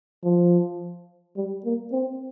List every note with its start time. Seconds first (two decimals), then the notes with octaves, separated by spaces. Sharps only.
0.24 F3
1.37 G3
1.65 A#3
1.92 C4